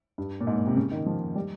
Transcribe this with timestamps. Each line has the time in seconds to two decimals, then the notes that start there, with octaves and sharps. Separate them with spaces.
0.18 G2
0.41 A#2
0.47 G#2
0.56 A#2
0.67 C3
0.77 C#3
0.91 D#3
1.06 F3
1.35 G3